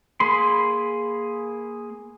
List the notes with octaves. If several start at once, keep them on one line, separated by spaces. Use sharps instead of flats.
A#3 G#4 B5 C6